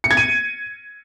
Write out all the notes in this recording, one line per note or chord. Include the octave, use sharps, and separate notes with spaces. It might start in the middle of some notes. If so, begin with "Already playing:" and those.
C#7
G#6
D#7